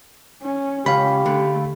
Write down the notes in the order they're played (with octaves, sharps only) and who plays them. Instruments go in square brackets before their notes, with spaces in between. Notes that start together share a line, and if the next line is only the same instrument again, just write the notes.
[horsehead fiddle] C#4
[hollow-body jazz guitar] C#2 [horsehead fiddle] C#4 [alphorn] G4 [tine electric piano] F5 B5
[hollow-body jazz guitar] D3 [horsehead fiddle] A3